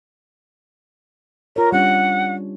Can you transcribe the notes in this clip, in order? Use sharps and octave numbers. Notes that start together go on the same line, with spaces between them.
F4 A#4 C#5
G3 C#4 D4 F#5